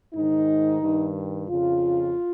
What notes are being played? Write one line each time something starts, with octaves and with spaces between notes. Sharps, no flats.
G#2 D#3 D#4
G2 D#3
F2 C#3 F4